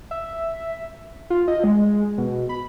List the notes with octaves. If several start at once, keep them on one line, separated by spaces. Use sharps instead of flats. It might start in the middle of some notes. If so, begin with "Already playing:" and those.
E5
F4
D#5
G#3
B2
B5